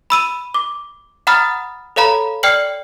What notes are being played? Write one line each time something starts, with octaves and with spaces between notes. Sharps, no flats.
B5 E6 D#7
D6
F#5 A#5 B5 D#6 F6 A6
A4 C#5 F5 A#5 B5
D5 G5 F6 C7 C#7 F#7